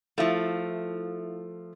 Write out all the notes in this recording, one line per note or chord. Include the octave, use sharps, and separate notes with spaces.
F3 A3 E4 E5 F5